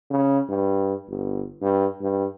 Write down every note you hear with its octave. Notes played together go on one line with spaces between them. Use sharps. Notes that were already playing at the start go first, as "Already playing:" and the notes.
C#3
G2
G1
G2
G2